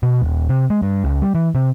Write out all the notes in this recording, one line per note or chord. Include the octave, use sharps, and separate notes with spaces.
B2
D#1
C3
G#3
G2
C#2
G3
E3
C3